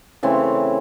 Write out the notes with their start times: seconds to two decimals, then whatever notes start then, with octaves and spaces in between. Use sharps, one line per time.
0.23 C#3 E3 A3 C4